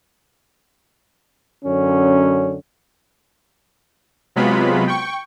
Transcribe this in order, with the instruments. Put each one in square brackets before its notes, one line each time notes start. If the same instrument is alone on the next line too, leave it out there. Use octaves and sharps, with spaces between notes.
[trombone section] F#2 D3 C#4
[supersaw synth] C3 F#3 G#3 B3 F4 B5
G5 C#6